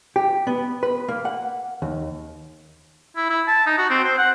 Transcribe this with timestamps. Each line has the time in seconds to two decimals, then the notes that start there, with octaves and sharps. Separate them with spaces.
0.16 G4
0.47 B3
0.83 B4
1.08 A#3
1.25 F#5
1.82 D#2
3.16 E4
3.30 E4
3.47 A5
3.66 D#4
3.78 F#4
3.90 C4
4.04 C5
4.18 F#5